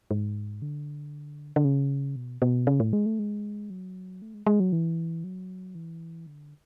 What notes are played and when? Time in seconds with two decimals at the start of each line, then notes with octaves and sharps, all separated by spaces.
0.11 G#2
0.62 D3
1.56 D3
1.65 C#3
2.16 B2
2.42 B2
2.67 C#3
2.80 A2
2.93 G#3
3.06 A3
3.19 G#3
3.70 F#3
4.22 A3
4.34 G#3
4.47 G#3
4.60 F#3
4.72 E3
5.24 F#3
5.75 E3
6.27 D3